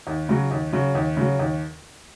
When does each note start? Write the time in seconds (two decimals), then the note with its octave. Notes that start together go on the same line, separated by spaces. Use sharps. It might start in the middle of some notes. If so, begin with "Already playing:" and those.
0.07 D#2
0.29 C#3 F#3
0.51 D#2
0.73 C#3 F#3
0.95 D#2
1.17 C#3 F#3
1.39 D#2